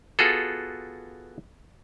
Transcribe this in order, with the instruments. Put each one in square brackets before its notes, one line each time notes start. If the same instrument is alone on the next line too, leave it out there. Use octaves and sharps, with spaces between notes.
[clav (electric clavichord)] B3 F4 F#4 G#4 A4